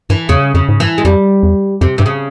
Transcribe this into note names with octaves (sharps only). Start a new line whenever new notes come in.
G2 E3
E2 C#3
F2 C#3
G#2
G2 E3
G#3
F2 G3
E2
F2 C3
G2 C3
C#3